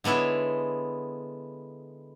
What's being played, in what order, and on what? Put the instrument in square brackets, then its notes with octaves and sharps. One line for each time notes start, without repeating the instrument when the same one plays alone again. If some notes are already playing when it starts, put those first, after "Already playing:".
[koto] D3 G#3 B3 E4 C#5